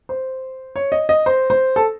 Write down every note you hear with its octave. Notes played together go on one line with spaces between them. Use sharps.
C5
C#5
D#5
D#5
C5
C5
A4